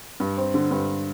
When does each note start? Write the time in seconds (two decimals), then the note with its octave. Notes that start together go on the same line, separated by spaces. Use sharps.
0.20 G2
0.37 C4
0.54 D3
0.71 G2